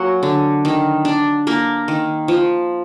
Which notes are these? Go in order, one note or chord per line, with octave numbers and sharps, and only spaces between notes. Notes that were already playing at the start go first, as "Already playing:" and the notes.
Already playing: F#3 A#3 F#5 G#5
D3
D#3
D4
A#3 A#4
D#3
F3